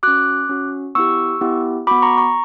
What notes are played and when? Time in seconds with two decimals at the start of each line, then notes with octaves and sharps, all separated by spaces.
0.03 C#4 F#4 D6 F#6
0.49 C#4 F#4
0.95 B3 E4 G4 C#6 E6
1.41 B3 E4 G4
1.87 B3 F#4 B5 D6
2.02 A#5 C#6
2.18 A#5 C#6